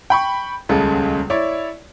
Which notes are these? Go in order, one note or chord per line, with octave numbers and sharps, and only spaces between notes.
G5 B5 C#6
D#1 C#2 C#3 G#3 A4
E4 C#5 D5